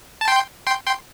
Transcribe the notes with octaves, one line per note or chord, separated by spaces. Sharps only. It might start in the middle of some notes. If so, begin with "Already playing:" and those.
A5
G5 C6
G5 C6
G5 C6